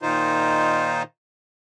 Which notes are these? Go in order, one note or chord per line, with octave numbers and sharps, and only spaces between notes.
A#2 D#3 D#4 F4 C5